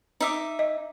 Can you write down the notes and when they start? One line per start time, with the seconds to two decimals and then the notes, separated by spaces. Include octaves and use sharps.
0.21 D#4 E5 D6
0.59 D#5